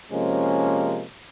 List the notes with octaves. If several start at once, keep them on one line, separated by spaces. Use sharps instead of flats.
C3 F3 G#3 A#3 C#4